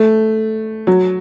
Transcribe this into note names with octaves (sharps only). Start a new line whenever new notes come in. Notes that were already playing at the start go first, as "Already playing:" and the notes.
Already playing: A3
F#3